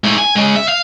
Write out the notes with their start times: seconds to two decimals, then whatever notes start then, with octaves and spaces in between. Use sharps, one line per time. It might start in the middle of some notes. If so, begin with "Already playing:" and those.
0.04 G#2 A3
0.18 G#5
0.36 G#3 C#4
0.56 E5
0.68 F5